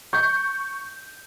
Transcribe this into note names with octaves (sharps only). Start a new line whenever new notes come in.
C#6 G6